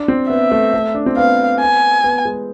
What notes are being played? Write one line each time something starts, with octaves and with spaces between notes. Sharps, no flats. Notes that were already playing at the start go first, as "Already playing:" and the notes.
Already playing: D4
C4
B3 E5
A3
A3
D4
C4
B3 F5
G#5
B3
G#3